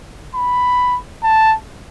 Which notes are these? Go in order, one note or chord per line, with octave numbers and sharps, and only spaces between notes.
B5
A5